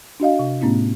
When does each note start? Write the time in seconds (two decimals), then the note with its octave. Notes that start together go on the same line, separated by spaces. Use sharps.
0.20 D4 F#4 D#5 F5
0.39 C3
0.61 A2 A3 B3 C#4 E4